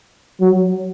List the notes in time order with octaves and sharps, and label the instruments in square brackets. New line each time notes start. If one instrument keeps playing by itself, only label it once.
[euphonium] F#3